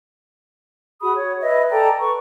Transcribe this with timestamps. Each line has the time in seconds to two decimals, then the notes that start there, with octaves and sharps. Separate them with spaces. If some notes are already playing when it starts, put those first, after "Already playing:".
1.02 F#4 G#4 B5 D#6
1.16 C#5
1.42 B4 D#5 E5
1.71 A4 D5 G5 A#5
1.99 B4 C#6